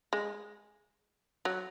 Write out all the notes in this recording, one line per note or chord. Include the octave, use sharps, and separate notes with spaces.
G#3
F#3